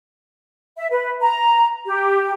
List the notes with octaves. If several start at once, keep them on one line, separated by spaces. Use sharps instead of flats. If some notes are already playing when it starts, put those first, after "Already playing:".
E5
B4
A#5
G4